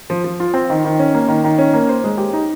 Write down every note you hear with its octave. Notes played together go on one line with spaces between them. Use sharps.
F3
F3
F4
C4
D#3
D#3
C#4
A#3
D#3
D#3
C#4
A#3
C5
G#3
G4
D#4